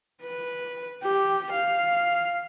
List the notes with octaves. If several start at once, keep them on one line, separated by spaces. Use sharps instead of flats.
B4
G4
F5